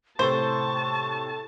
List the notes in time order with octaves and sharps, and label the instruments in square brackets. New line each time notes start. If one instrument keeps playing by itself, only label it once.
[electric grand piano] A2 C3 A4 [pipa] C5 [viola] A5 [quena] C#6